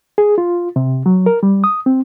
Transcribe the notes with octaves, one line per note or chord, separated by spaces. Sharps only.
G#4
F4
C3
F#3
A#4
G3
D#6
C4